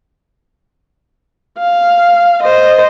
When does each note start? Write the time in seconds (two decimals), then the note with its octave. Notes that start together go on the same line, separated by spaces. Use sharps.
1.59 F5
2.43 C5 D#5